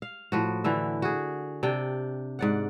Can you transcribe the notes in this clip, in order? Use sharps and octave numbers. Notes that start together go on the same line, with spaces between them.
F5
A2 F3 F#4
D3 E3 E5
F#4 G#4
C3 D4 G5
G#2 D5 F#5